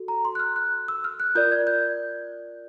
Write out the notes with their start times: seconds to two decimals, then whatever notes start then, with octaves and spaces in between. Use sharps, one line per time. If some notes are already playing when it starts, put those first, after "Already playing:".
Already playing: F#4 A4
0.08 A#5
0.25 C6
0.35 F#6
0.39 F6
0.56 F#6
0.88 E6
1.04 F6
1.20 F#6
1.35 F4 A#4 D5 G6
1.52 G#6
1.67 G6